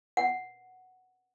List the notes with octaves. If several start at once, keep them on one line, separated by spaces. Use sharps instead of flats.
F#5